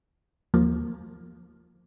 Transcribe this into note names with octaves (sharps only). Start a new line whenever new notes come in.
D#2 F3 A#3